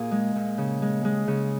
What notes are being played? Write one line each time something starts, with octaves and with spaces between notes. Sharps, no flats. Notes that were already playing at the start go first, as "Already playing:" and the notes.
Already playing: A#2 G#4
G#3
A#2
C#3
G#3
G#3
C#3